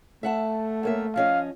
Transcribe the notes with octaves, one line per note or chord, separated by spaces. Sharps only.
A3 E5 F#5 A5
F#2 A#3 E5
F3 C#4 D#5 F5